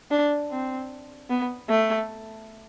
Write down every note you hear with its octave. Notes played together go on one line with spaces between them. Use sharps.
D4
C4
B3
A3